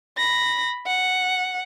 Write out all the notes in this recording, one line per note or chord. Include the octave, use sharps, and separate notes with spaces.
B5 A#6
F#5